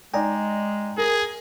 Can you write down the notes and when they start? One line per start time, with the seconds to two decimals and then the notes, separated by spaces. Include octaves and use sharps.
0.14 G#3 D#4 D5 D#5 G5 G#5 A#5
0.98 G#4 A#4